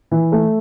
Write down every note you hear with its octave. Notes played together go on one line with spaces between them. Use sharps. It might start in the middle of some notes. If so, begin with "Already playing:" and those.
E3
A3